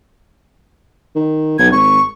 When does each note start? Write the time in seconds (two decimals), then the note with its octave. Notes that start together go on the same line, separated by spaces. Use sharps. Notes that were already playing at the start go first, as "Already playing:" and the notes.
1.15 D#3
1.59 B1 G#6
1.72 G#1 C#6